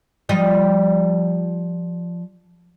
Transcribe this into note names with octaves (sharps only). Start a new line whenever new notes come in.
F3 G3 D#5